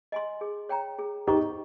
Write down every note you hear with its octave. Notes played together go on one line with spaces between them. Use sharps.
D#5 G#5 C6
G#4
C#5 G5 A#5
G#4
D#4 G4 C5 D#5 A#5 C#6